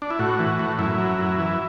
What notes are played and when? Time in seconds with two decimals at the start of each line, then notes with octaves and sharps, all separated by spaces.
0.02 D4
0.10 E4
0.19 A2 F#4
0.39 E3
0.59 A2
0.79 F#2 E4
0.98 F#3
1.19 F#2
1.38 E3